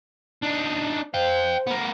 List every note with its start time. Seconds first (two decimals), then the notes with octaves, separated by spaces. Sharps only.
0.42 D4 D#4
1.14 C5 F5 G5
1.67 B3 A#4